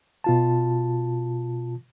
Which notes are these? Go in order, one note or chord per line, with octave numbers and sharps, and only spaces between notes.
B2 F4 A5